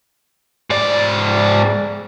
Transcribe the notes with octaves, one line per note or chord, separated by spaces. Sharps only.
G#2 D5